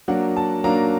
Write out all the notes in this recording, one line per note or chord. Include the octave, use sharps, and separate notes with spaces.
F#3 A#3 D4 F#5
A5
F#3 A#3 D4 A#5